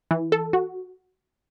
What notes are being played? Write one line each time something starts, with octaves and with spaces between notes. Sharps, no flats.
E3
A4
F#4